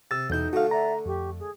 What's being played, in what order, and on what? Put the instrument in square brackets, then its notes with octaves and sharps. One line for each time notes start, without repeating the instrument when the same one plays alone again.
[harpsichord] C3 [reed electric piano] E6 A6
[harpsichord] B1 E4 [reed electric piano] E2 G6 [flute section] D#4
[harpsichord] D3 A3 [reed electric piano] F#4 F5
[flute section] D5 E5 F#5 [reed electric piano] A#5
[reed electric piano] F2 [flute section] G4 C#6
[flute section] G#4